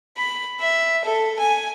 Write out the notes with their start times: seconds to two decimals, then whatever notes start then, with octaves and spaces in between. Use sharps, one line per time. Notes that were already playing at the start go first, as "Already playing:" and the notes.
0.17 B5
0.60 E5
1.04 A4
1.39 G#5